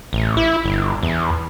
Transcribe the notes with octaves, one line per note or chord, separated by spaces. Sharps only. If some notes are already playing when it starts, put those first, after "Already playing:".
A1
E4
G1
E2